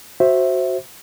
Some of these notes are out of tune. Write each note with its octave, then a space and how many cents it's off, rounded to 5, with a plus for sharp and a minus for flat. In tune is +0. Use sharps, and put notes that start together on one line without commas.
F#4 +0 C5 +10 E5 +0